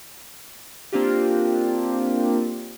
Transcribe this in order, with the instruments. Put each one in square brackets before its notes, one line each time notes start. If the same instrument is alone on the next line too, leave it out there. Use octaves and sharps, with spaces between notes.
[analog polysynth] A#3 C4 D4 F4 G4